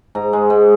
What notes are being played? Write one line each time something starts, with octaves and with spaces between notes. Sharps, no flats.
G#2 A#5
G#3
G#2